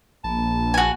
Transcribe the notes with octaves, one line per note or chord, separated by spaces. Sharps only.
A#1 A#3 A5 B5
F#4 G#5